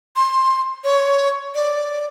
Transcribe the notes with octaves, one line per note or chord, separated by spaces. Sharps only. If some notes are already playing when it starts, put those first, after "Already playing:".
C6
C#5
D5